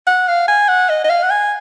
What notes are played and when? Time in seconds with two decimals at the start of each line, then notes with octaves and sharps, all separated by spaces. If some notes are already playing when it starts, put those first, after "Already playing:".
0.07 F#5
0.28 F5
0.48 G#5
0.68 F#5
0.90 D#5
1.04 D#5
1.10 F5
1.23 F#5
1.30 G#5